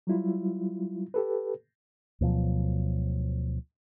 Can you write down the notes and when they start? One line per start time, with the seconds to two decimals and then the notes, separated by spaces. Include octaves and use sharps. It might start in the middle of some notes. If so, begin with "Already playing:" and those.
0.07 F#3 G3 E4 F4
1.14 G4 A4 B4
2.21 D2 B2 F3 F#3